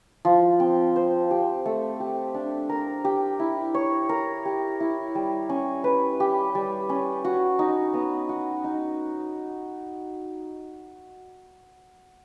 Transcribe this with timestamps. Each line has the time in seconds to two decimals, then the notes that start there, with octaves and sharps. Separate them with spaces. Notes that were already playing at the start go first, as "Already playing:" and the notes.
0.25 F3
0.60 C4
0.96 C5
1.31 G4
1.66 A3
2.00 G4
2.34 D4
2.69 A#4
3.05 G4
3.40 E4
3.74 C#5
4.09 A#4
4.45 G4
4.80 E4
5.15 G3
5.49 C#4
5.84 B4
6.20 G4
6.55 G3
6.89 C#4
7.25 F#4
7.59 D#4
7.94 B3
8.29 F#4
8.64 D#4